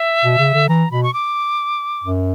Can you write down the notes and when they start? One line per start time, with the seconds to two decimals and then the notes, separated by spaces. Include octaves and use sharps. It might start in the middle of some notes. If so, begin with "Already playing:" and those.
Already playing: E5
0.24 B2
0.39 C#3
0.54 D3
0.69 E3 A#5
0.91 B2 B5
1.03 C#6
1.14 D6
2.04 F#2